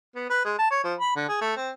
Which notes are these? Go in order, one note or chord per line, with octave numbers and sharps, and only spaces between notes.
B3
B4
G#3
A5
C#5
F3
B5
D3
G#4
A3
C4